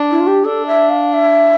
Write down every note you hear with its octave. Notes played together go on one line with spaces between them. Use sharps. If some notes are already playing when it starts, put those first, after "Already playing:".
Already playing: D4
E4
F4
G4
D4 A4
E5
F5
E5